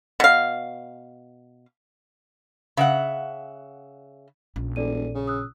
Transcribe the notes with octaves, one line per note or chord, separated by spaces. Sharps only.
B2 F5
C#3 E5 F#5
A#1 C#4
E1 A4 D5 D#7
C#3
D#6 E6 F#6